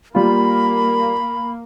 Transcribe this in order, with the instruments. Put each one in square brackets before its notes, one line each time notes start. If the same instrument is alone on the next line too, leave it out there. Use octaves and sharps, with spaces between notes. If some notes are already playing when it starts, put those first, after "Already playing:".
[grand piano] G3 F4 [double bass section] A#3 [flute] B5